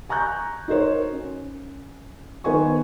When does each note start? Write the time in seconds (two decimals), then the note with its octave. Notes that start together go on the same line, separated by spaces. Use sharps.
0.09 G#5 A#5 C#6 F#6 G6
0.68 D#4 F#4 A#4 C5 C#5
1.12 C#4
2.44 D#3 B3 B4 C5 G#5 C#6